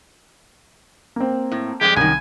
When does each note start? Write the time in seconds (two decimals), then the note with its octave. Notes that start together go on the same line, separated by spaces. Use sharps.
1.16 A#3 C4
1.52 A2
1.81 F2 G3 G#3 G4 G#6
1.96 C2 F#2 D#3 G#5